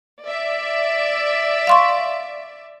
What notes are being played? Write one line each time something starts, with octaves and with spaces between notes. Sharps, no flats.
D5 E5
F5 C6 C#6